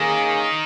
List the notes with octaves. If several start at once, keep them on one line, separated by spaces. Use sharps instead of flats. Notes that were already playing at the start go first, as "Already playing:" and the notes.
Already playing: D#3 A#3 C#4 G#4